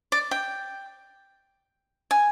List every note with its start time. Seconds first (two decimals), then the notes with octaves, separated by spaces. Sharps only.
0.12 D5
0.31 G5
2.11 G#5